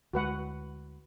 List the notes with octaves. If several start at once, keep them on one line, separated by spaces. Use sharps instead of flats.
D2 G#3 F#4 B4 F#5